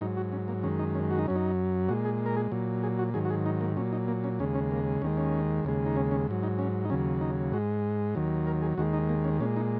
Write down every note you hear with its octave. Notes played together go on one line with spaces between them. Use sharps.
G#2 F#3 D#4
F#4
C#4
A#3
F#2 D#3 G#3 C#4
D#4
C#4
F#4
D#4
F#2 F#3 C#4
D#4
A#2 G#3 F#4
G#4
A#4
G#4
A#2 F#3
G#4
F#4
G#2 D#3 F#3 G#4
F#4
G#4
D#4
A#3
A#2 F#3 C#4
D#4
A#3
C#4
D#2 C#3 G#3 C#4
C#4
A#3
D#2 D#3 G#3 C#4
C#4
D#2 C#3 G#3
D#4
C#4
C#4
G#2 F#3
D#4
C#4
D#4
D#2 C#3 F#3 C#4
D#4
G#2 G#3 F#4
D#2 D#3 F#3
A#4
G#4
D#2 D#3 G#3 F#4
D#4
A#3
C#4
A#2 G#3 C#4
D#4